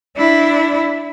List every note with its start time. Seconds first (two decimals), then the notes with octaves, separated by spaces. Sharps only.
0.17 D4 E4